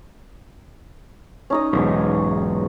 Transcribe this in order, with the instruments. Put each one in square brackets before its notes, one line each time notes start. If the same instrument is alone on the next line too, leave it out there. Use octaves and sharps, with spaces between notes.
[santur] C#4 D#4 D#5
[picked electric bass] B1 E2 G#2